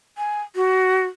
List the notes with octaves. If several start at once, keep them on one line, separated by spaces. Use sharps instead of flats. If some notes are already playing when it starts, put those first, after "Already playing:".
G#5
F#4